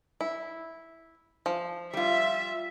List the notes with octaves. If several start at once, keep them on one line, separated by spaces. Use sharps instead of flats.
E4
F3
G3 F4 E5